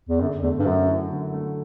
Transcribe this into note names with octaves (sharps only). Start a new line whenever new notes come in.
E2
F#2 D3
E2 A3
G2
F#2 F#3
E4
D3
A3